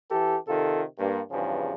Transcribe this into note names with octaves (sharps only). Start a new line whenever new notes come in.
E3 G4 A4
C3 D#3 F4 A4
G2 A#3
E2 G2 C#3 F3